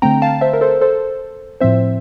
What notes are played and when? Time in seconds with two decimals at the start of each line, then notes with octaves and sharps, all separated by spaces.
0.02 D3 A3 C4 G5 A#5
0.22 F5 A5
0.41 C5 E5
0.53 A#4
0.61 A4 C5
0.81 A4 C5
1.61 A2 F3 C4 C5 E5